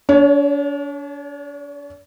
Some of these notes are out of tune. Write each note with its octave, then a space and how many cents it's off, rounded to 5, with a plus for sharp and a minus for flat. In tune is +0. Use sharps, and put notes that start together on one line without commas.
D4 -40 C#5 +15